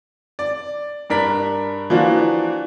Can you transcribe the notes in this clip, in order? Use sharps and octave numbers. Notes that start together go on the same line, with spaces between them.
D5
G2 D4 A#4 B6
E3 F3 A#3 D4 F4 F#4